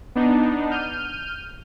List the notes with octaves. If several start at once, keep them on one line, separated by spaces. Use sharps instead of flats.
B3 D4 D#4
F6 G6 D#7